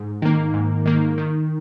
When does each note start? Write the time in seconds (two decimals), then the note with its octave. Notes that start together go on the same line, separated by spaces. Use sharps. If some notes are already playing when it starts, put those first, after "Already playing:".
Already playing: G#2
0.22 D#3 A#3
0.54 G#2
0.86 D#3 A#3
1.18 D#3